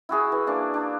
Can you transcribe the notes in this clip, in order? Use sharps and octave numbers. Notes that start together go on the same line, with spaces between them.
E4 F#4 G#4 E5
E3
A#3 D4
D4